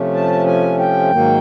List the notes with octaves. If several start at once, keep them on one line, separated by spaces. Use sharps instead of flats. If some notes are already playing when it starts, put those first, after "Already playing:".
Already playing: C3 F3 A3 C#4
A5
G#5
G5
G#2 D#3 F#3 A#3